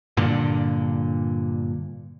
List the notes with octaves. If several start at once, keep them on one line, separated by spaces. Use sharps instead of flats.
G2 A#2 D3